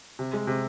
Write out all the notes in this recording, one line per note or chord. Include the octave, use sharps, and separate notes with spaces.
C3
G#3
C3